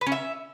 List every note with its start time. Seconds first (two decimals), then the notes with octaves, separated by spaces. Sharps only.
0.01 B4
0.07 C#4
0.12 E5